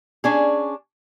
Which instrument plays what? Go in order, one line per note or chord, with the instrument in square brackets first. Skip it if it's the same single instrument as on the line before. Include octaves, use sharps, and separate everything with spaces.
[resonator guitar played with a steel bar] C#4 D4 G#4